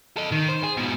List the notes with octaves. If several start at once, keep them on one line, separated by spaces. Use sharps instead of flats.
A4 D#5
D#3
C5
G#4
G#2 B2